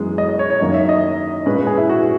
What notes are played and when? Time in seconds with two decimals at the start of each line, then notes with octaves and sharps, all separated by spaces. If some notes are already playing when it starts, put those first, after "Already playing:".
Already playing: F#2 E3 G#3 B3
0.18 D#5
0.29 D#5
0.39 C#5
0.50 C#5
0.60 F#2 D#3 A#3 D#5
0.74 E5
0.89 D#5
1.46 A#2 G#3 C#4 B4
1.56 B4
1.67 G#4
1.77 E4
1.89 F#4
2.02 F#4